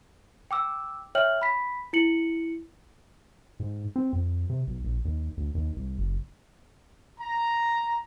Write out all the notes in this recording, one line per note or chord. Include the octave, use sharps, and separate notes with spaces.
G5 D6 E6
C#5 E5 G5 F6 F#7
B5 B6
E4 C#7 F#7
G#2
C4
F2
C3
B1
A#1
D#2
D2
D#2
C2
F#1
A#5